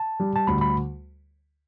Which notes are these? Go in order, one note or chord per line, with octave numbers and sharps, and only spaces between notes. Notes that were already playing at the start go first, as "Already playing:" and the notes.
Already playing: A5
G3
A5
D2 B5
B5